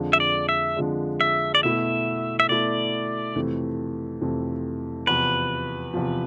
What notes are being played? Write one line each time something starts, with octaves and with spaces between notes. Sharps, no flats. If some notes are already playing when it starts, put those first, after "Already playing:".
Already playing: F2 D3 F3 G#3
E5
D5
E5
F2 D3 F3 G#3
E5
D5
B2 A3 E4 E5
E5
B2 A3 E4 D5
F2 C3 E3 A3
F2 C3 E3 A3
E2 C3 F3 B4
E2 C3 F3